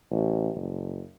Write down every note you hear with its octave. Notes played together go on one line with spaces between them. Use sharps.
A1
F#1